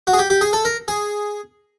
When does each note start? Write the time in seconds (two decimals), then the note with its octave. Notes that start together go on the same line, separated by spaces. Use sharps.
0.07 F#4
0.13 G#4
0.19 G4
0.30 G4
0.41 G#4
0.53 A4
0.65 A#4
0.88 G#4